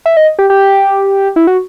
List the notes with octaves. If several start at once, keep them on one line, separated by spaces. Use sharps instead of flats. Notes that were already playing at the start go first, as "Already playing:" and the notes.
E5
D#5
G4
G4
E4
F#4